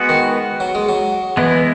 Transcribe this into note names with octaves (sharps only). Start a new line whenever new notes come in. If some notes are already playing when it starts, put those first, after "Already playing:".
Already playing: G#3 B3 F#4 B4
D#3
F#3
G#3
F#3
E3 G#3 B3 E4